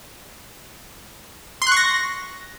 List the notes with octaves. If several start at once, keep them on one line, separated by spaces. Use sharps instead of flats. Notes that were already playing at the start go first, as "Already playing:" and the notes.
C6 C#6 F#6 A#6